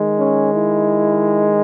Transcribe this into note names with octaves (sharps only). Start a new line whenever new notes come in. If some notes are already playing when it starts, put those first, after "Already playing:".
Already playing: D#3 G#3
C#4
E4